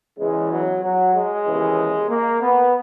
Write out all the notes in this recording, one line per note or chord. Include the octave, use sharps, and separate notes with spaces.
E2 C#3 E3 G#3
F#3
F#3
G#3
D#2 C#3 E3
A#3
B3